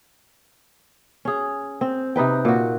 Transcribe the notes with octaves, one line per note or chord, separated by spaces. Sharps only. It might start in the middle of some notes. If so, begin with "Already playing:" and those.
C#4 G#4
C4
C3 D#4 B4 G5
A#2 F#4